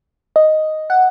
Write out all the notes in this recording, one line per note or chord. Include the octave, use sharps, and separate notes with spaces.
D#5
F#5